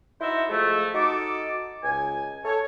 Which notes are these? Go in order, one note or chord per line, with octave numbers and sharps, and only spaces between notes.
D#4 E4 F#4 C5 E5
F3 G#3 A3
D#4 F#4 A4 D6
C#2 G#5
A4 C#5